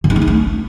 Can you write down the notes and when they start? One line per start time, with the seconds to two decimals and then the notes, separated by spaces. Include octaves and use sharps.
0.04 D3
0.10 D#4
0.16 A#3
0.22 A3
0.27 D4